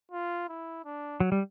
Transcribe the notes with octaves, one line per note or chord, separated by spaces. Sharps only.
F4
E4
D4
F#3
G3